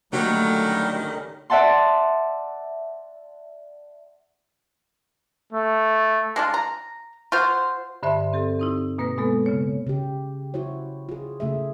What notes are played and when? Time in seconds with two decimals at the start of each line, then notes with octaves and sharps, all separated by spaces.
0.13 D3 D#3 F#3 G3 A3 A#3 C#4 D#4
1.50 D5 E5 F#5 A5 C6
5.52 A3
6.36 G#3 D4 F4
6.54 A#5
7.32 F4 F#4 C5
8.03 G2 D3 C5 E5 A5 C6
8.33 C4 G4 A4
8.60 C4 D#4 E4
8.98 B2 A#3 B4 A#6
9.18 B2 G#3 B3 A4
9.46 C#3 C#5
9.87 C#3 G4
10.54 E4 F#4 C5 C#5
11.09 F4 G#4
11.40 C#3 A3 G#4 E5